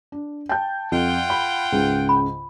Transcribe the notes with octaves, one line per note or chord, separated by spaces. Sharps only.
D4
G5 A5 G6
F2 F4 F#5 G5
B5
C#2 G#2 C#3
B5